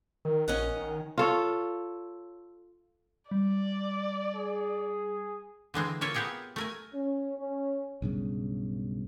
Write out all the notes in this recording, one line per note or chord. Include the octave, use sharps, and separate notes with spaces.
D#3 A#4
A#1 C#4 D#5 F#5
D#3
F4 A4 C#5
G3 D5
G#4
D3 E3 G#3 C4
A#3 F4 C#5 E5
B3 C4 G4 G#4 A#4
A3 A#4 G#5
C#4
C#4
B1 G2 C#3